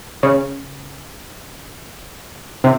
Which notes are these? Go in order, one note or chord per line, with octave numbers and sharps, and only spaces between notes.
C#3
C3